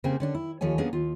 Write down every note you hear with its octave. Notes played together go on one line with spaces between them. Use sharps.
C#3 A#3 C4
D3 C#4 D4
E4
D#2 F3 A4 C#5 G#5
A#3 B3 C#4 D4 G#4
D#2 F4